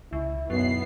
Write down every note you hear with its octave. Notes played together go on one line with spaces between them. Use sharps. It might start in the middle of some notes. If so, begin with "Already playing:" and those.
C#2 E4
B1 F#2 B3 C7